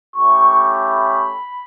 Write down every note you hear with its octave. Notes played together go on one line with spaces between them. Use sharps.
A3 C#4 E4 G4 C#6
B5